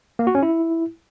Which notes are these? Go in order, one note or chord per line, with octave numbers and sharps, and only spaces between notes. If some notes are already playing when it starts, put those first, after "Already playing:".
A#3
F#4
C#4
E4